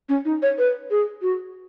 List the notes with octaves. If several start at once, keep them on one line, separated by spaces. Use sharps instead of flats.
C#4
D#4
C#5
B4
G#4
F#4